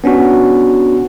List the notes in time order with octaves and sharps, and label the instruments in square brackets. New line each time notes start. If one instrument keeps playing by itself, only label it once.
[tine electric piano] B3 C#4 D4 F#4